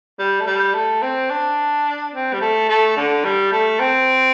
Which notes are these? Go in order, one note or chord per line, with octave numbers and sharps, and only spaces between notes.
G3
A3
G3
A3
C4
D4
C4
G3
A3
A3
D3
G3
A3
C4